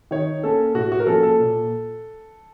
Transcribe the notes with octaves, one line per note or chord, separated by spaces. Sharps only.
D#3 C#5
A#3 C#4 A4
A2 F#4
F#4
A#4
F3 A#3 C#4 A4
A4
A#2